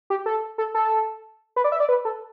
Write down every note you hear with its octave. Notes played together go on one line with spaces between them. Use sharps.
G4
A4
A4
A4
B4
D5
E5
D5
B4
A4